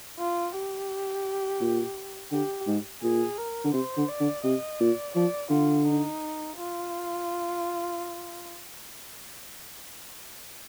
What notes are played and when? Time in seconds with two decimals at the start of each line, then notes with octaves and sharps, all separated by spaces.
0.19 F4
0.55 G4
1.61 A#2
2.32 D3 G4
2.67 G#2
3.02 A#2 G#4
3.38 A#4
3.64 D3
3.73 C3 C5
3.97 D3
4.09 D5
4.21 D3
4.44 C3 D#5
4.80 A#2 D5
5.15 F3 D5
5.50 D3 F4
5.86 D#4
6.57 F4